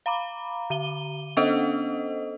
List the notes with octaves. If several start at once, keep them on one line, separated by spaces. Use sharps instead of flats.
F5 A#5 B5 D6
D3 D#7 G7
B3 C#4 D4 A4 C5 D#5